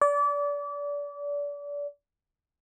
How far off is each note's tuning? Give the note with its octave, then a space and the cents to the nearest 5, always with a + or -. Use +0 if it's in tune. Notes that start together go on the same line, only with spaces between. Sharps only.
D5 -30